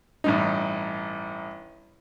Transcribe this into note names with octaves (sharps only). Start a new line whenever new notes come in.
A1 G2 D#4